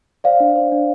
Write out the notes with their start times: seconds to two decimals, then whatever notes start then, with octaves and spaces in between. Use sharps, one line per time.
0.24 C5 D5 F5
0.40 D4
0.56 C5
0.72 D4